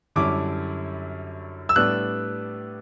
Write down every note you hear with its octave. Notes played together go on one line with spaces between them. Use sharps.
F#2 D3 G3 C#4 E4 D6
E6
A2 G3 B3 D4 F#6